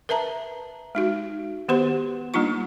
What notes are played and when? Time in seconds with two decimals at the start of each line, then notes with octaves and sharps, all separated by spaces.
0.09 A#4 B4 E5 A5 A#5
0.95 G#3 D#4 F#4
1.68 D#3 B3 G4 B4 C5 C6
2.34 G3 A#3 D4 D#4 F4 C#6